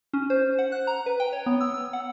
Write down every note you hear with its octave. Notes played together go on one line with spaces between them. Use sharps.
C#4
C5
F#5
F#6
A#5
B4
G5
C#5
B3
E6
E6
F#5